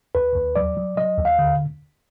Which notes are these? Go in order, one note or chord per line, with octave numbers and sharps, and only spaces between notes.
D#2 B4
D#2
F#3 D5
F#3
F#3 D#5
D#2
F5
D3